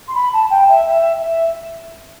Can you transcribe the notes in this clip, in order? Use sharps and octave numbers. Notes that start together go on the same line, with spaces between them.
C6
B5
A5
G5
E5
E5
E5